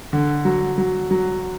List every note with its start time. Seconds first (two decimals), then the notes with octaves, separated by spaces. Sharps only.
0.13 D3
0.45 F#3
0.78 F#3
1.11 F#3